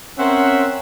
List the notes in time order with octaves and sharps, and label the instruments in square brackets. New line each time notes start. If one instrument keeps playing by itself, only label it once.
[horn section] C4 C#4 A#4 C5 E5 F#5